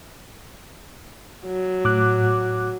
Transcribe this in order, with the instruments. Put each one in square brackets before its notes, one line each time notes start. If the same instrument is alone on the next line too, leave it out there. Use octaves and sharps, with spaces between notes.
[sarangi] F#3
[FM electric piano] A2 D6 F#6